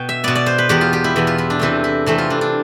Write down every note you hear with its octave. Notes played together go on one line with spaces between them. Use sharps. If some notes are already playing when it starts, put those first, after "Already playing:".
Already playing: B2 G5
E5
B2 B3 D5
D5
C5
B4
E2 B2 B3 G4
F4
G4
E4
E2 B2 B3
F4
E4
D4
C3 E3 A3 C4 E4
E4
C3 E3 A3 C4 E4
F4
D4
D4